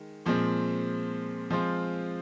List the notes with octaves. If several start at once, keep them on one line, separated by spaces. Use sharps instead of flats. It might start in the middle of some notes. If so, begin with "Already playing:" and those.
Already playing: D#3 G#3
A#2 F3 G#3 C4
F3 G#3 C4 F4